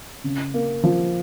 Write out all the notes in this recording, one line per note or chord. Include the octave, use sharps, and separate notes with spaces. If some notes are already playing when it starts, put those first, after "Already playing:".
C#3
A#3
F3